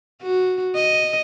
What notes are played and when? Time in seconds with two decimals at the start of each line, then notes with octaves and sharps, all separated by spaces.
0.23 F#4
0.75 D#5